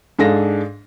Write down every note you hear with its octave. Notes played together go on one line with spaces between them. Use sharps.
G#2 D4 G#4 A4 F5 A#6